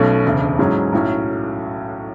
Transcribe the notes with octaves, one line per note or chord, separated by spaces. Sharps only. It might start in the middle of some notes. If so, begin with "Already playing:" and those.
Already playing: B1 B2 A3 C#4
E1 D2 C#3
G#2 F#3 C#4 E4 G#4
B1 A2 F#3 C#4